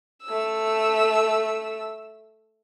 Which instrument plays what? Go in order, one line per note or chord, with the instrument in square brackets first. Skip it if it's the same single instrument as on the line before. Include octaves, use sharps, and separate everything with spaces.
[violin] A3 E6